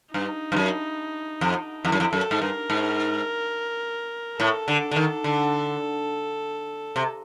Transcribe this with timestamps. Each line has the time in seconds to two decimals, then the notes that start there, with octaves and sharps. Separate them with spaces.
0.14 G2 D#4
0.52 G2
0.56 F#2
1.41 F2
1.85 F2 E4
1.92 F#2
2.00 F2
2.12 F#2 A4
2.31 G#2
2.41 G2 A#4
2.70 G#2
4.39 A2 A4
4.68 D3
4.91 D3
4.96 D#3
5.24 D3
6.96 C3